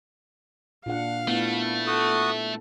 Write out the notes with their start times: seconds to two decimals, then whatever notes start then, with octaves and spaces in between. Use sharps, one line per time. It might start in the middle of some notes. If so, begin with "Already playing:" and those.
0.86 A#2 D4 F5 F#5
1.28 A3 B3 E4
1.87 F#4 A4 D#6